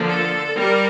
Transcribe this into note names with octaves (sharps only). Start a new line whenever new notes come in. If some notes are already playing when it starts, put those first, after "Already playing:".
Already playing: D3 F3 A#3
A4
G3 A#4